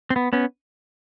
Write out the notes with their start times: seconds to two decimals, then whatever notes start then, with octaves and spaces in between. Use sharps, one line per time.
0.10 C4
0.16 B3
0.33 B3 C#4